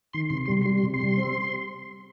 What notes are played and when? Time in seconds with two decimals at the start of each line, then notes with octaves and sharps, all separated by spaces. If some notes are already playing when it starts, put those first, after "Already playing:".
0.13 D#3 C6
0.30 C3 C6
0.46 G3 C6
0.62 C6
0.65 G3
0.78 C6
0.83 C3
0.94 C6
1.01 G3
1.17 C4